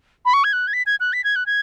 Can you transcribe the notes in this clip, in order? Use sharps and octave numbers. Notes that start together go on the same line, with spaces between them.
B5
C#6
G#6
F#6
G#6
B6
G#6
F#6
B6
G#6
F#6
G#6